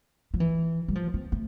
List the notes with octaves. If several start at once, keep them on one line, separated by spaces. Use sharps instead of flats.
F3
E3
G3
F3
C4
A3